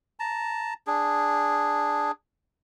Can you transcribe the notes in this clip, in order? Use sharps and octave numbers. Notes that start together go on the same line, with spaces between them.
A5 A#5
D4 G#4